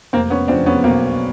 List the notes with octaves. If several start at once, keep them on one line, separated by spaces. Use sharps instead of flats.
F1 A#3 C4
B3 C#4
E2 C#3 F3 C4 D4
B3 C#4
B1 A#3 C4